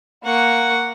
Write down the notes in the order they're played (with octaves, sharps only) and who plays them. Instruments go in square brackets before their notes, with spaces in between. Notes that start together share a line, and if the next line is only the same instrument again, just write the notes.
[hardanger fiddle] A#3 C#6 [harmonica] F#5